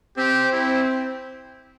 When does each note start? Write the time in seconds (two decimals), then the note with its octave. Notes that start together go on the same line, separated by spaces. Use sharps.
0.17 C4 G4
0.52 E4